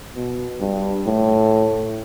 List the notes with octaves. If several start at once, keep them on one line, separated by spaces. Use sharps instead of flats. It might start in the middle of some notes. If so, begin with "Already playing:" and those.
B2
G2
A2